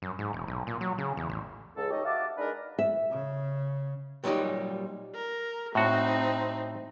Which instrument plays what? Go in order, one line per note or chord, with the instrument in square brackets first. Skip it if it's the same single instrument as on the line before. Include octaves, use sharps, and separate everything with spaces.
[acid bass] F#2
G#2
E1
B1
A#2
F#3
C#3
E2
A1
[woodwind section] C#2 A4
D#4 G4 C#5 D#5
F#4 E5 F5 A5 D6
G#3 D4 D#4 A#4 B4 D5
[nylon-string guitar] E5
[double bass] C#3
[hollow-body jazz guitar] A#2 F#3 G3 D#4 G4
[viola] A#4
[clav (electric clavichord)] A2 F#4 [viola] C4 D#4